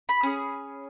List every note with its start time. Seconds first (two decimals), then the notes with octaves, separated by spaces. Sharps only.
0.09 B5
0.23 C#4 G#4